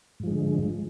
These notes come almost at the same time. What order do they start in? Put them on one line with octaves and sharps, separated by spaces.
G#2 F3 G#3 D3